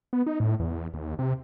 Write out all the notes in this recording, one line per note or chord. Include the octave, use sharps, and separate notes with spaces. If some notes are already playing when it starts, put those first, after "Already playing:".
B3
D#4
A2
E2
D#2
C3